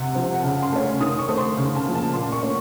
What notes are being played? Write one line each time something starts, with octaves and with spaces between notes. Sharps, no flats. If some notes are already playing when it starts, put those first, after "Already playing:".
Already playing: C3 F#5
F3 C4
F#5
C#3 A5
C6
A3 C#4
D#3 D#6
C#6
A3 C4
C6
C#3
A5
F3 A#3
A5
A#2 C6
C#6
A3 C#4